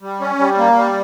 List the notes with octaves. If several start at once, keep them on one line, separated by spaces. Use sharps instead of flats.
G3
C#4
G3
A#3
G3